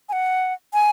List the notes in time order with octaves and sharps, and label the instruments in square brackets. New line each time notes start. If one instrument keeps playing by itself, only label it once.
[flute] G#5
F#5
G#5